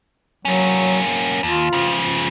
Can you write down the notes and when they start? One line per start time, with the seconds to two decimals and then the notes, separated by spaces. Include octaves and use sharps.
0.45 F#3 A#3 C#4
1.43 D#2 F4
1.73 C#3 F3